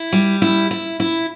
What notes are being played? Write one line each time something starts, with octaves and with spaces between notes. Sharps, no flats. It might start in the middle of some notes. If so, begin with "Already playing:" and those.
Already playing: E4
G3
E4
E4
E4